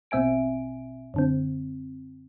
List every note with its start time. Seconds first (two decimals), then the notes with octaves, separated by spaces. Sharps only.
0.11 A#1 B2 C4 E5 G#5 D7
1.14 F#2 D3 C4